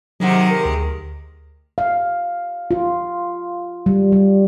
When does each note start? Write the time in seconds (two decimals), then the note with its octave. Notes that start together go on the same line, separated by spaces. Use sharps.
0.20 C3 D#3 F#3 G#3 F#5
0.51 A#4
0.65 D2
1.78 F5
2.71 F4
3.86 G3
4.12 G3